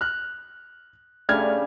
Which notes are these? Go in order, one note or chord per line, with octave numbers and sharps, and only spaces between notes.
F6 F#6
C#3 G3 A3 D4 F6 G#6